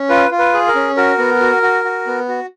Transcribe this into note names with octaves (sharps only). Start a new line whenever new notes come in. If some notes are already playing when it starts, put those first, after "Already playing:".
Already playing: C#4
F4 B4
F4
B4
G#4
A#4
C#4
F#4 A#4
B3
F#4
F#4
F#4
B3
F#4